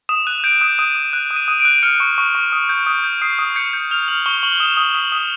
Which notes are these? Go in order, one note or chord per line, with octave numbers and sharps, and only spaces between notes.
D#6 E7
F#6 D#7
G6 D7
D#6
D#6 D#7
D#6
F#6
D#6
D#7
D#6
D7
F#6
F6 C#7
C#6
C#6
C#6
D#6
G6
D#6
G6
D#6 C7
D#6
G6 C#7
G6
F6 F7
F6 F#7
C#6 G7
C#6 F#7
D#6 E7
D#6
D#6 F#7
D#6